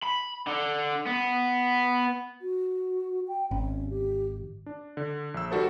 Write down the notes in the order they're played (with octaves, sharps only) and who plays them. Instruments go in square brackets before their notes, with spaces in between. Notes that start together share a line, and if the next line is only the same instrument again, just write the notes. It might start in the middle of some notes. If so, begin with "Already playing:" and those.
[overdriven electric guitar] B5
D3
B3
[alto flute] F#4
G5
[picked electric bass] G#1 [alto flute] C#4
[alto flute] G4
[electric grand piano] D4
D3
A#1 E6
D#3 G3 F#4 A4 C5